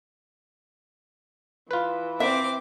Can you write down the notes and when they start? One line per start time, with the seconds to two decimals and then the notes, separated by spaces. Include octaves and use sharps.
1.71 E3 F4 B4
2.20 C4 E5 D6